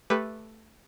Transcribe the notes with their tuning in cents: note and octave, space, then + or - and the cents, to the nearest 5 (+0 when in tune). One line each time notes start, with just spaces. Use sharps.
A3 +0 G4 +10 B4 +0